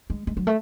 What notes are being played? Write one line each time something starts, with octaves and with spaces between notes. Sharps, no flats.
G#3
G#3
F#3
A3